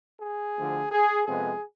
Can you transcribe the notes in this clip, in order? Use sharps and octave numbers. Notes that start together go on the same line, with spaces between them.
G#4
D2 D3 F3
G#4
F2 C3 G#3 B3 G#4